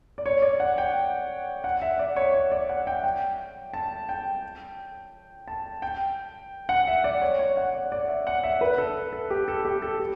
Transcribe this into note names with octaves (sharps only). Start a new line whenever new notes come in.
D5
C#5
D5
F#5
G5
F#5
E5
D5
C#5
C#5
D5
F#5
G5
G5
A5
G5
A5
G5
F#5
E5
D5
C#5
C#5
F#5
D5
D5
E5
F#5
E5
B4
A4
A4
G4
A4
G4
A4
G4